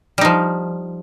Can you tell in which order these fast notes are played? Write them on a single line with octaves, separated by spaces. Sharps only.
G3 D#4 F3